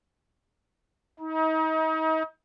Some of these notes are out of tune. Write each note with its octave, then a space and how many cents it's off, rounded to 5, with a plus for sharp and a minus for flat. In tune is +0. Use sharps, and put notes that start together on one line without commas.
D#4 +35